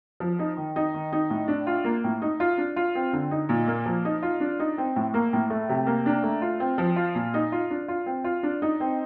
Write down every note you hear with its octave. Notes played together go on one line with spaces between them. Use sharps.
F3
D#4
D#3
D#4
D#3
D#4
A2
D4
F4
A#3
A2
D#4
F4
D4
F4
C4
D3
D#4
A#2
A#3
F3
D#4
F4
D4
D#4
C4
A2
A#3
A2
A3
C3
A#3
D4
A3
F4
C4
F3
F4
A#2
D#4
F4
D4
F4
C4
F4
D4
D#4
C4